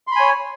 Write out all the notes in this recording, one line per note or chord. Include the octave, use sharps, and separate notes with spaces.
C#5 G#5 B5 C6